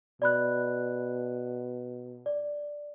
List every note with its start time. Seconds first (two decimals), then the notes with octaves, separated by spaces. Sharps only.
0.22 B2 D5 B5 F#6
2.26 D5